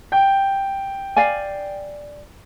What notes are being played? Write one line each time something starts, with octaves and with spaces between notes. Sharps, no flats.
G5
D5 F5 G#5